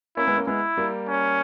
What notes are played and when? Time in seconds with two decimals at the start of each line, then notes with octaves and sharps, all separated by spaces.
0.17 A#3 C#4 E4
0.28 G#3 B3
0.37 A#3 C#4
0.47 G#3 B3 E4
0.77 G3 A#3
1.08 C#4